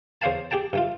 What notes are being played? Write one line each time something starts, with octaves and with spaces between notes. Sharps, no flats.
E2 C5 C#5 F5 G#5 A5
G4 G#4 G5 A5
G2 A3 F4